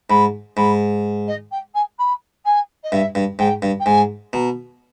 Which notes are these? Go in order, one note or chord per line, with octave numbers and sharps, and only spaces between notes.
G#2 B5
G#2 B5
D#5
G5
G#5
B5
G#5
D#5
G2 E5
G2
G#2 G5
G2
G5
G#2 G#5
B2 A#5